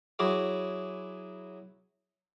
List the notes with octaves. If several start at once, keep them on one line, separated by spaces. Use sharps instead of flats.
F#3 E4 F#4 G#4 D6